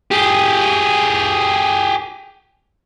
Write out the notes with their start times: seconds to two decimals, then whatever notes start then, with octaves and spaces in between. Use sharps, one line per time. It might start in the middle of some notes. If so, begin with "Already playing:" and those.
0.11 G4 G#4